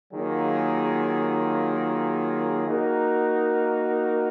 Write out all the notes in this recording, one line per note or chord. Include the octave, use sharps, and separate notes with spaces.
D#3 F#3 A#3 F4 G#4
A#3 D#4 F#4 A#4